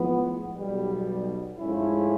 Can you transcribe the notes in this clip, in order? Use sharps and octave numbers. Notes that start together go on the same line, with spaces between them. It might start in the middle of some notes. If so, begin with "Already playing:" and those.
Already playing: A2 F3 G#3 B3
B1 B2 G3
G#2 F3 A3 C#4 E4